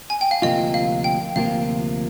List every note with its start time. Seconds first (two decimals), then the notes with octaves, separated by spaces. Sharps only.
0.10 G#5
0.21 G5
0.31 F5
0.42 D2 C3 F3 A#3 F4 D#5
0.74 F5
1.04 G5
1.36 D2 C3 F3 A#3 F4 F5